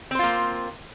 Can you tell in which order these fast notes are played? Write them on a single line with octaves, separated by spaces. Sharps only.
C4 C5 F4 A#3